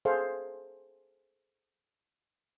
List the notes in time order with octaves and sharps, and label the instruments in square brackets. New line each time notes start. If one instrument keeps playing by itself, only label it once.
[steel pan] G#4 A4 C5 F5